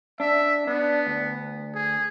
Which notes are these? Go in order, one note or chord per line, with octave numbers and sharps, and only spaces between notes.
D4 E5
B3 D4
D2
G#4